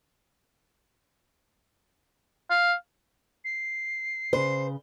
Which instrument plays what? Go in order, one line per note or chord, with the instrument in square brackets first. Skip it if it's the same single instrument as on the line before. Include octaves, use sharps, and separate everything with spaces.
[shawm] F5
[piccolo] C7
[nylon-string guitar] C#3 B4 [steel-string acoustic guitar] C5